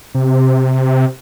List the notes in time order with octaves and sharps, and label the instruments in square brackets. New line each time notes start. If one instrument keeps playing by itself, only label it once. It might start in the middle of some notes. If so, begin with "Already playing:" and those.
[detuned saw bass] C3